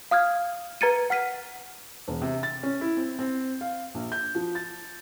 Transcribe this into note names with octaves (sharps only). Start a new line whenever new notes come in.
F5 D#6 F6 G#6
B4 A#5 G#6 A6 C#7 D#7
F#5 F6 B6 D#7
E1
C3
A6
C#4
E4
C4
C4
F5
A#1
G6
F3
A6